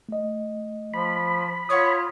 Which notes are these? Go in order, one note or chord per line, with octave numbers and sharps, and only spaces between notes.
A3 D#5
F3 B5
F4 C#5 F#5 D#6